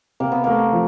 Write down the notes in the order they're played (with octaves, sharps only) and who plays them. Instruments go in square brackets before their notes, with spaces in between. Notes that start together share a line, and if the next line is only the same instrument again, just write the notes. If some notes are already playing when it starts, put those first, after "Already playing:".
[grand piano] C3 [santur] A#3
[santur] B3
[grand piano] A3 [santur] A#3
[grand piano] F3